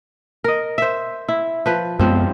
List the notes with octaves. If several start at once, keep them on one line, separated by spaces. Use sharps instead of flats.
A#4 D#5
C5 E5
E4
F3 B4
F#2 F3 G#3 B3 C4